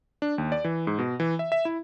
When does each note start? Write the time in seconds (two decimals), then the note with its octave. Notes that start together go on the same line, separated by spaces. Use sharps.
0.22 D4
0.38 D#2
0.52 D5
0.64 E3
0.87 G#2
0.99 B2
1.20 E3
1.39 E5
1.52 E5
1.65 E4